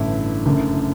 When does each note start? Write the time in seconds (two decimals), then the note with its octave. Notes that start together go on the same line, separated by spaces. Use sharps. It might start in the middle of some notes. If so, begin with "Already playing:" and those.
Already playing: A1 G2 D3 A3 E4
0.45 F#1 F#2 D3 A3